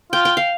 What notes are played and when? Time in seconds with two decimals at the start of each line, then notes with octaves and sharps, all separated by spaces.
0.12 F4 G5
0.25 G5
0.37 F5